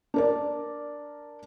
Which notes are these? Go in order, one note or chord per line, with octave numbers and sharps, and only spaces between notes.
D4 A#4 D5